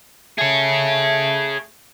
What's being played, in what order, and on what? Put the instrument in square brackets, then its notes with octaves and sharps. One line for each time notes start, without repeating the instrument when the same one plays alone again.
[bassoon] A3 [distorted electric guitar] G#4 C#5